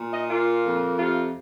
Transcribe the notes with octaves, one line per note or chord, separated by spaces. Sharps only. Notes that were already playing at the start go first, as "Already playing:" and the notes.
Already playing: A#2
D#5
A#3 F4
F2
C3 F4